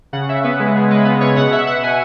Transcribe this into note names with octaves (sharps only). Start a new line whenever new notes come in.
C#3 F#5
C#3 E5
B3 B4
G#3
C#3 G#4
G#3 B4
B3 B4
C#3 C#5
B2 F#5
B2 E5
B2 F#5
B2 G#5